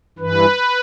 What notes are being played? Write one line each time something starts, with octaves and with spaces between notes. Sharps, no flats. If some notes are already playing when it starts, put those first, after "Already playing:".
G2 E3 B4